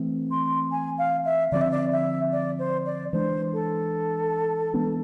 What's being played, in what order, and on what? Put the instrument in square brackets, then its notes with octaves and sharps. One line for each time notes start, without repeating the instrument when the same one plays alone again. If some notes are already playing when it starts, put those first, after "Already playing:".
Already playing: [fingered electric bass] E3 A3 C4
[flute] C6
G#5
F5
E5
[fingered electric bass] D3 F3 G#3 C4 [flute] D5
[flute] E5
D5
E5
D5
C5
D5
[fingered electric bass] E3 G#3 D4 [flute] C5
[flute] A4
[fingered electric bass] E3 G#3 B3 D4